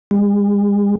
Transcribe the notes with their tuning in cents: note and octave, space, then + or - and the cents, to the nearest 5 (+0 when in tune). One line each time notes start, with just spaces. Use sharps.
G#3 -40